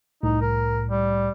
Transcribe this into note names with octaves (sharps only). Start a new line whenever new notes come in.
C2 A2 D#4
A#4
G3